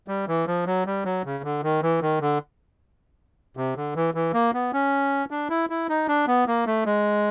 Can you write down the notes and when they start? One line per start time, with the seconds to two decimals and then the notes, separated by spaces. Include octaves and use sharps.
0.08 G3
0.28 E3
0.47 F3
0.66 F#3
0.86 G3
1.05 F#3
1.25 C#3
1.44 D3
1.63 D#3
1.82 E3
2.02 D#3
2.21 D3
3.57 C3
3.76 D3
3.96 E3
4.14 E3
4.34 A#3
4.54 B3
4.73 C#4
5.31 D4
5.50 E4
5.70 E4
5.89 D#4
6.08 D4
6.27 B3
6.47 A#3
6.66 A3
6.86 G#3